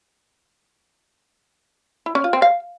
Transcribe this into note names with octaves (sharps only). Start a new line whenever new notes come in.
E4
C#4
F4
C4
F5